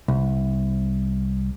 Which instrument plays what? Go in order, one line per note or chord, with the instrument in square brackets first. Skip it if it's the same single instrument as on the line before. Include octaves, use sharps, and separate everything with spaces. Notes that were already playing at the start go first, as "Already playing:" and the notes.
[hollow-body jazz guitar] C2